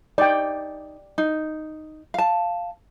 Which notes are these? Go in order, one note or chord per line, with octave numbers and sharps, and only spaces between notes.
D#4 D5 G5
D#4
F5 A5